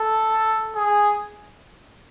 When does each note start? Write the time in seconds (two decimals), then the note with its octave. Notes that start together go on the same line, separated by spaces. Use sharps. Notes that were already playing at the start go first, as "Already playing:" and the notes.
Already playing: A4
0.76 G#4